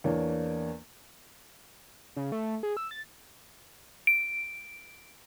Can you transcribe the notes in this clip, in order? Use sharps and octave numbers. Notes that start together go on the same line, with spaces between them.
E2 A#3 D4 C#5
C#3
A3
G#4
E6
A6
D7